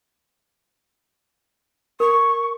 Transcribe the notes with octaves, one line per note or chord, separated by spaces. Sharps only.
A#4 C#6